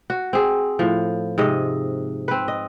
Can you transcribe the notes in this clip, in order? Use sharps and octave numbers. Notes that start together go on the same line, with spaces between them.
F#4
C4 G#4
A2 F3
G#2 C3 D#5
C4 B4
D#5